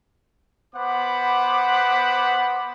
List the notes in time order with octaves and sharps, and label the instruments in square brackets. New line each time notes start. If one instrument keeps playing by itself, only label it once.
[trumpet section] B3 C5 F#5 B5 D6